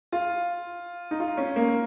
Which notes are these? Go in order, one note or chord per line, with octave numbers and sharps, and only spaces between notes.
F4
D#4
F4
C#4
A#3